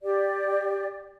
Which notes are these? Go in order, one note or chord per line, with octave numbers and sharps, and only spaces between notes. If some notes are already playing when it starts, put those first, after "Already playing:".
G4 D5